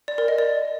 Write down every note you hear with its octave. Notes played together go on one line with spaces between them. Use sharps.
D5
A#4
D#5
D5